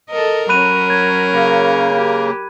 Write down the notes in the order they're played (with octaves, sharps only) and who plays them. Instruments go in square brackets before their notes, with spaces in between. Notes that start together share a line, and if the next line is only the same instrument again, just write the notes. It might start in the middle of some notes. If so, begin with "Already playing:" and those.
[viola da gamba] A4 D#5 [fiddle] A#4
[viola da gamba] F#3 C#4 [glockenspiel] B5 F#6 D#7
[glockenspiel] G#6
[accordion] C#3 A#3 [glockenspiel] B5
[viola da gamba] G4